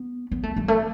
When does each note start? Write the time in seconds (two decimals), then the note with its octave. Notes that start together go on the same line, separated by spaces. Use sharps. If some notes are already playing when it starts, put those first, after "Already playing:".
Already playing: B3
0.32 B3
0.43 A3
0.56 G3
0.68 A3